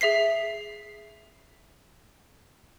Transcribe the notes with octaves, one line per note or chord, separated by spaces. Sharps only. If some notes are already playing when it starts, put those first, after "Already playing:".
G#4 E5 B6 C7